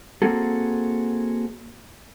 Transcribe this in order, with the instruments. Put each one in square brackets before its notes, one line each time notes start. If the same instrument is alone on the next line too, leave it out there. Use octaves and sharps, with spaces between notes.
[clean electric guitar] A#3 C4 F#4 G#4 A4